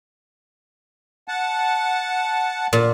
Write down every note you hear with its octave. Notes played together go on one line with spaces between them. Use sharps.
F#5 A5
A#2